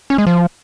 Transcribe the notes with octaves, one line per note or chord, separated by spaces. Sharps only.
C#4
G#3
F3